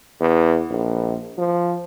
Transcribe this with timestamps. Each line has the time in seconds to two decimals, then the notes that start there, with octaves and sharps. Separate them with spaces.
0.21 E2
0.71 A#1
1.38 F3